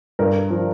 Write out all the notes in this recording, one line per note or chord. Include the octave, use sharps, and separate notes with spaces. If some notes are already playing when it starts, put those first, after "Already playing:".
G2 A#4
F3